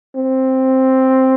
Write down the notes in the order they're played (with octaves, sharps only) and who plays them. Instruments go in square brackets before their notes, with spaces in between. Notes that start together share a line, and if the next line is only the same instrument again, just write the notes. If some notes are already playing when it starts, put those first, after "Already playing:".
[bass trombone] C4